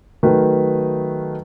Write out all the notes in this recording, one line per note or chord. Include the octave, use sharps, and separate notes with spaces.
D#3 F#3 A3 B4